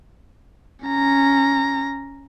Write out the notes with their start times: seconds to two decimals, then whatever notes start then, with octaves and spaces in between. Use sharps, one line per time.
0.86 C#4 A#5